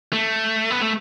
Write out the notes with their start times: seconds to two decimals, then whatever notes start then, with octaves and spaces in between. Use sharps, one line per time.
0.13 A3
0.71 B3
0.81 A3